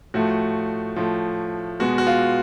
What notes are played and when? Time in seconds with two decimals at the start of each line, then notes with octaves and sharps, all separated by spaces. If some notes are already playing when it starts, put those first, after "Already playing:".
0.14 A2 F3 A3 F#4
0.96 A2 F3 A3
1.80 B2 G#3 B3 F#4
1.98 F#4
2.07 F4